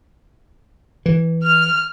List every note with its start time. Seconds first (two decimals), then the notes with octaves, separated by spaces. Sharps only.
1.06 E3
1.44 F6